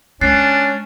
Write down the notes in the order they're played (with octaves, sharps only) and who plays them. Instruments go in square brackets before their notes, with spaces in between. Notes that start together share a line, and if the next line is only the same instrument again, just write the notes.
[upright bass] G#3 [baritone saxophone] C#4 [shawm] D4 [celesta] F#6 A6 C7